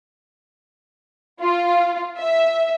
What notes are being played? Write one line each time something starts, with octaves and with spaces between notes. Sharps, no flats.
F4
E5